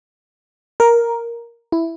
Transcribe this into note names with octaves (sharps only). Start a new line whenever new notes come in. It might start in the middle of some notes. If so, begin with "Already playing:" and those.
A#4
E4